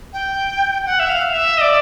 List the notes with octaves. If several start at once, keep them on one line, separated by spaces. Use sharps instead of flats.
G5
F#5
E5
F5
E5
D#5
D5